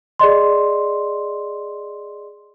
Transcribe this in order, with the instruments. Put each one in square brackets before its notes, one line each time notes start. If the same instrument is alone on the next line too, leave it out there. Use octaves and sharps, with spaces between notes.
[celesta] G#4 D5 D#5 C6